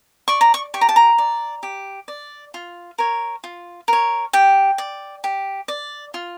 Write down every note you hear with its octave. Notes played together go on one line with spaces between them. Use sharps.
D5 C#6
A#5
C#6
G4 C#6
A#5
A5
A#5
D5
G4
D5
F4
A#4 C#5
F4
A#4 C#5
G4 G5
D5
G4
D5
F4